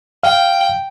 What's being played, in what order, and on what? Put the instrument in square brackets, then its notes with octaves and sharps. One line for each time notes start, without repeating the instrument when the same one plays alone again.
[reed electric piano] F5 [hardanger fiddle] G5